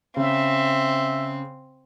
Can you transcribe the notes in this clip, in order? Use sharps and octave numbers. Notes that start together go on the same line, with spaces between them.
C#3 C4 E5